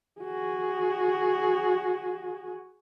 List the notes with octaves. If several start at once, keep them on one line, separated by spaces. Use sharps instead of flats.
F#4 G#4